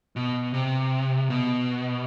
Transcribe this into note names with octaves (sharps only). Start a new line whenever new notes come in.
B2
C3
B2